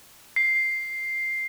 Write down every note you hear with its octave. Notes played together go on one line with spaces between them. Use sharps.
C7